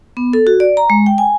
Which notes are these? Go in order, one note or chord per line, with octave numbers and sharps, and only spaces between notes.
B3
A4
F#4
D5
A#5
G#3
G5
G#5